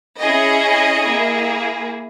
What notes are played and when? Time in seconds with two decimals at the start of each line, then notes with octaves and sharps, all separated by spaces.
0.20 C#4 E4 G#4 D#5
1.03 A#3 E4 G#4